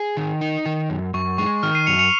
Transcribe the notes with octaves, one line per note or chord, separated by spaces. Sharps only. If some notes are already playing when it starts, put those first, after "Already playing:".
Already playing: G#4
D#3
D#4
D#3
F#2
F#2 C#6
G#3 C#6
D#3 F6
C7 D#7
F#2 C#7 F7
C#7 F7